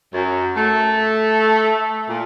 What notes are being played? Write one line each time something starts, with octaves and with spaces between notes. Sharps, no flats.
F#2
A3
A#2